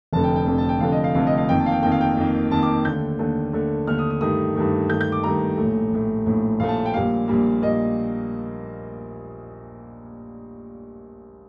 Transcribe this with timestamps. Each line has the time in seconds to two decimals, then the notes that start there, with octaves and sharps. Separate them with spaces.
0.13 F1 F2 D3 A3 A5
0.24 G5
0.36 G5
0.47 F1 F2 D3 A3
0.58 A5
0.69 G5
0.80 F1 F2 D3 A3 F5
0.92 D#5
1.04 F5
1.15 F1 F2 D3 A3 F5
1.27 D#5
1.38 F5
1.49 F2 D#3 A#3 G5
1.60 A5
1.66 F5
1.72 G5
1.82 F2 D#3 A#3 G5
1.92 F5
2.01 G5
2.17 F2 D#3 A#3
2.51 F2 D#3 A#3 A5
2.62 D6
2.85 D#2 D3 A3 G6
3.19 D#2 D3 A3
3.53 D#2 D3 A3
3.87 D#2 D3 A3 F6
3.98 D#6
4.10 D#6
4.21 G2 D#3 A3 D#6
4.55 G2 D#3 A3
4.90 G2 D#3 A3 G6
5.01 G6
5.12 D6
5.24 G2 D#3 A3 A#5
5.57 A#1 A2 A3
5.91 A#1 A2 A3
6.26 A#1 A2 A3
6.60 A#1 A2 A3 F5
6.68 A5
6.86 G5
6.94 A#1 A#2 G3 A#3 F5
7.28 A#1 A#2 G3 A#3
7.62 A#2 G3 A#3 D#5